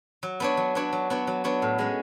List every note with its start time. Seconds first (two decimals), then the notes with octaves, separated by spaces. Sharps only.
0.23 F#3
0.40 B3 D4 F#4 C#5
0.57 F#3
0.75 B3 D4 F#4 C#5
0.93 F#3
1.10 B3 D4 F#4 C#5
1.27 F#3
1.44 B3 D4 F#4 C#5
1.62 A2
1.79 G#3 C#4